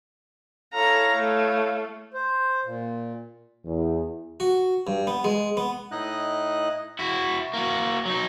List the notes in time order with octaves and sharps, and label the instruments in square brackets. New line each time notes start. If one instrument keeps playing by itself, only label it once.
[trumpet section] E4 C#5 F5 [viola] A4 A#5
[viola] A3
[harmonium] C5
A#2
[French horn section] E2
[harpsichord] F#4
G2
B3
G#3
B3
[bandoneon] A2 D#4 E4 D#5 F#6
[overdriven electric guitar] E4 F#4
A#3 F#4
F#3 D#4